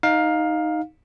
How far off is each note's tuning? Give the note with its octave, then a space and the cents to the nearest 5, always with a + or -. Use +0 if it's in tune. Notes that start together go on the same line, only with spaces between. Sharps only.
D#4 +0 F5 +15